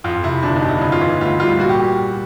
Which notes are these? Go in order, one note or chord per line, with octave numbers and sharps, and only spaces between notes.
F2 F4
C3 E4
G1 D4
D#4
G1
E4
C#3 D#4
F4
E3 E4
D2 F4
G3 F4
A#2 F#4
G4